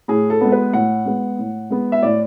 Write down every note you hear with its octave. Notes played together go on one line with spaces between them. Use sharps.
A2 G#4
A4
G#3 B3
B4
A2 F#5
G#3 B3
A2
G#3 B3
E5
A2 D5